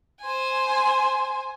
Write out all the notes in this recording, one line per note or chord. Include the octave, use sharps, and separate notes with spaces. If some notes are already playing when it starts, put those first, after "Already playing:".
C5 G#5